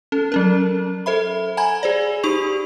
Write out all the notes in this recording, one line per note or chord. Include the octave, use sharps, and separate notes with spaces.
C#4 A4
F#3 C#4 A#4
A4 C5 E5 B5
F#5 G#5 A#5 B5 G#6
G#4 C5 D5
D#4 G4 C#6 F7